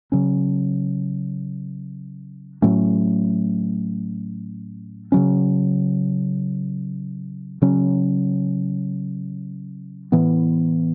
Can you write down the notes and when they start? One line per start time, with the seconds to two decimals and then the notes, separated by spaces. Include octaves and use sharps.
0.12 C#3 F#3 C#4
2.62 A2 F#3 A3 C#4
5.12 C#3 F#3 C#4
7.62 C#3 F#3 C#4
10.12 A2 E3 B3